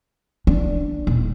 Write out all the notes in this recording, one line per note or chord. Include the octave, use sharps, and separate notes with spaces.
D4
D#1